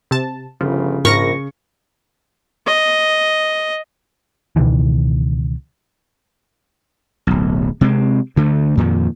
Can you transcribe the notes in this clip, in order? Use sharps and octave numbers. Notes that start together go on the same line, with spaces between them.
C3 A5
G1 C#3 F3
A#1 G#2 A#4 C#6 A#6
D#5
C#2 B2 D#3 E3
D1 B1
C3 G#3 C4
D2 D3 A3
F2 A#2 D#3